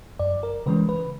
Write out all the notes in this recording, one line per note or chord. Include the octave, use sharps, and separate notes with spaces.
F#2 D5
A#4
C#3 E3 G#3 C#4 B4
B4